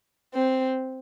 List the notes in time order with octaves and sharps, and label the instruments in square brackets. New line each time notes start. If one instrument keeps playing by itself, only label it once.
[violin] C4